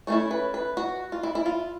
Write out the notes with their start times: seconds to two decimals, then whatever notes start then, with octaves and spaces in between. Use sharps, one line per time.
0.07 A3 C#4 E4 C#5
0.31 B4
0.54 B4
0.77 F#4
1.12 F4
1.23 E4
1.35 E4
1.46 F4